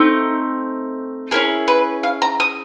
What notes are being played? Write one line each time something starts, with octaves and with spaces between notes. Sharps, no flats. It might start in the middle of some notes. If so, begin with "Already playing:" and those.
Already playing: A3 C4 D#4
C#4 E4 G#4 A#4
B4
F5
A#5
D#6